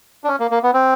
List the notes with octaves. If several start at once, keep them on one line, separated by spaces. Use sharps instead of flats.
D4
C#4
A#3
A#3
B3
C4